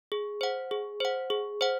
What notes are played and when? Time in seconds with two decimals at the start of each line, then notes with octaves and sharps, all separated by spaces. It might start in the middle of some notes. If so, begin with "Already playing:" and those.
0.12 G#4
0.41 C5 F#5
0.71 G#4
1.00 C5 F#5
1.30 G#4
1.61 C5 F#5